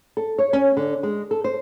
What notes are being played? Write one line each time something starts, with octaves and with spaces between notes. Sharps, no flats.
A4
C#5
C#4
D3
G#3
A4
C5